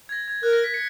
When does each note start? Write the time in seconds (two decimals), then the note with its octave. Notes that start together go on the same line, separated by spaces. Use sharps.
0.09 G#6
0.12 A#6
0.28 G#6
0.43 A#4 F#6
0.53 A#6
0.64 B6
0.74 C#7